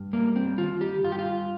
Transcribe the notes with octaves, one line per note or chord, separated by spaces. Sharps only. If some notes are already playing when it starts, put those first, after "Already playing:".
Already playing: G2
G3 A#3
C4
D#3 F4
G4
G2 F4
G4
F4